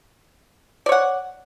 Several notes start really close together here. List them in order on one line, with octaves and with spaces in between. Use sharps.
D5 C#5 F#5